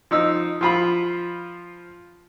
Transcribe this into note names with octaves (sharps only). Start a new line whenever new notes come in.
F3 D#4 E6
F3 F4 B5